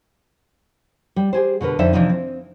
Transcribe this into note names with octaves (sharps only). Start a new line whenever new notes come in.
G3
G4 G#4 C5
B2 D3 A#4 B4
F2 D3 D#4 C5 D5 E5
C3 E3 F3 D4 D#4
C4